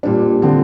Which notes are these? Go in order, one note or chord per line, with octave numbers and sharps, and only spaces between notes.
A#2 G3 D4
D3 F3 C4